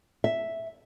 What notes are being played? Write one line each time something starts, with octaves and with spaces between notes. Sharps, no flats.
E5